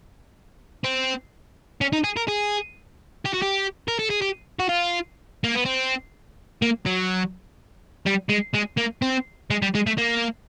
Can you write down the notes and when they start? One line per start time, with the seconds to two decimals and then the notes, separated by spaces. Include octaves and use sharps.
0.84 C4
1.81 C#4
1.93 D#4
2.04 G#4
2.17 A#4
2.28 G#4
3.25 G4
3.33 F#4
3.42 G4
3.88 A#4
3.99 A4
4.10 G#4
4.21 G4
4.59 F#4
4.69 F4
5.44 A#3
5.55 B3
5.65 C4
6.62 A#3
6.86 F#3
8.06 G3
8.29 G#3
8.54 G#3
8.78 A#3
9.02 C4
9.50 G#3
9.62 G3
9.75 G#3
9.87 A3
9.98 A#3